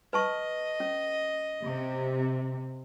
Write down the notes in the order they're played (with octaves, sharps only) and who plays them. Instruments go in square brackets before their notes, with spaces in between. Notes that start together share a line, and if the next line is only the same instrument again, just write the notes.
[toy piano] B4 A5 C#6 [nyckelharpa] D#5
[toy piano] C#4
[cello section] C3